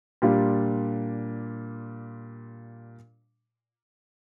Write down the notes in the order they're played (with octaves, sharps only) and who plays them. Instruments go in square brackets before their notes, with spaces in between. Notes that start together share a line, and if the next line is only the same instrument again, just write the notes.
[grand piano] A#2 G3 D4 F4